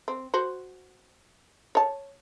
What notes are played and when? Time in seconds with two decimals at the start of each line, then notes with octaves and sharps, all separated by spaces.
0.08 C4
0.34 F#4 C5
1.75 C#5 A5